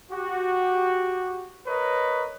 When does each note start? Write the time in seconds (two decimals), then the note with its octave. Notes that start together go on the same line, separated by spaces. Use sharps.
0.11 F#4 G4
1.67 A#4 B4 C#5 D#5